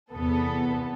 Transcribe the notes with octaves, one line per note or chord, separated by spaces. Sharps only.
E2 C3 B3 A4